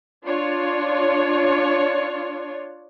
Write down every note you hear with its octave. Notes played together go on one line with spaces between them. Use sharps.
D4 F4 C#5